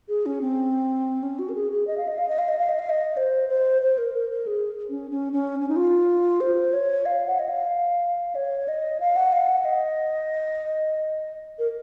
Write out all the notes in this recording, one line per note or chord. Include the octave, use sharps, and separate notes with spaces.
G#4
C#4
C4
C#4
F#4
A#4
G#4
G#4
D#5
F5
D#5
F5
D#5
F5
D#5
F5
D#5
F5
D#5
C5
C5
C5
A#4
A#4
A#4
G#4
C#4
C#4
C#4
C#4
D#4
F4
C5
C#5
F5
F#5
D#5
F5
C#5
D#5
F5
F#5
F5
F#5
D#5
A#4